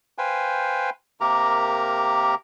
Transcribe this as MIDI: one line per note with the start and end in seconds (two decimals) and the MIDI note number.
0.18 0.90 71
0.18 0.90 72
0.18 0.90 77
0.18 0.90 79
0.18 0.90 80
1.21 2.35 48
1.21 2.35 58
1.21 2.35 67
1.21 2.35 70
1.21 2.35 82